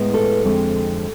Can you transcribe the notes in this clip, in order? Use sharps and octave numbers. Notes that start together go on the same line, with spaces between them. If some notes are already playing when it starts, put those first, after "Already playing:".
Already playing: A2 G#3 B3
A4
F2 D3 G#3 C4